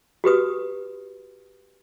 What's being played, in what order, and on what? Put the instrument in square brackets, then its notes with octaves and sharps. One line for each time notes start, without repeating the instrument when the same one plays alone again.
[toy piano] F#4 G4 B4 D#6